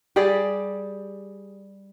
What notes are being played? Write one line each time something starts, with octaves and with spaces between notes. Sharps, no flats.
G3 G4 G#4 D5